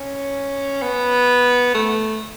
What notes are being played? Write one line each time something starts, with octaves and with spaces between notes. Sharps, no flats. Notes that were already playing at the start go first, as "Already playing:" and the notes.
Already playing: C#4
B3
A3